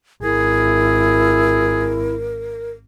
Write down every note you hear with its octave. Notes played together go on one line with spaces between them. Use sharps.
G#1 E4 G#4 A#4